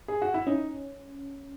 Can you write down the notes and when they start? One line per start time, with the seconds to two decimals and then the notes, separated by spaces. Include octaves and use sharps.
0.08 G#4
0.22 F#4
0.34 E4
0.47 C#4 D#4